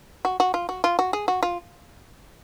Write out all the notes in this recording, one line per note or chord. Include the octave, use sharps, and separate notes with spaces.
F#4
F#4
F4
F#4
F4
F#4
G#4
F#4
F4